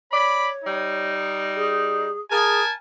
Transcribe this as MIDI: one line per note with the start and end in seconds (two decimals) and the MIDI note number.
0.11 1.13 73
0.11 0.47 74
0.11 0.47 83
0.64 2.09 55
0.64 2.09 63
1.56 2.20 68
2.30 2.60 68
2.30 2.72 70
2.30 2.72 80
2.30 2.72 81